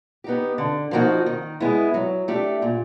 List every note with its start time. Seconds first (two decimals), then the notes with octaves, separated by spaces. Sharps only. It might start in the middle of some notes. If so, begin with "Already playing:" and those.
0.24 B3 D#4 G4
0.58 D3
0.91 F3 A#3 D#4 F#4
1.26 D#3
1.60 G#3 B3 E4
1.94 F#3
2.28 A3 D4 G4
2.62 A#2